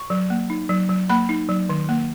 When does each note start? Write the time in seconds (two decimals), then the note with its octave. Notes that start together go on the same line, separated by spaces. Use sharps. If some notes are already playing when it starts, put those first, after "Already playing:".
Already playing: C#6
0.10 F#3
0.30 A#3
0.50 D#4
0.69 F#3
0.89 F#3
1.09 A#3 B5
1.29 D#4
1.49 F#3
1.69 D#3
1.89 A#3